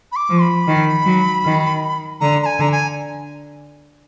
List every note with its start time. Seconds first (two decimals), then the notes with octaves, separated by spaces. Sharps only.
0.12 B5
0.16 D6
0.29 F3
0.42 B5
0.67 D#3
1.05 F#3
1.44 D#3
2.21 D3 A#5
2.42 A#5
2.46 G#5
2.59 D3 A#5
2.72 G#5